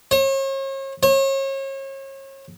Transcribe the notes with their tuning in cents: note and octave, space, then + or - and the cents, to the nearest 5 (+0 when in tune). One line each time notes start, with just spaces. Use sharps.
C#5 -40
C#5 -35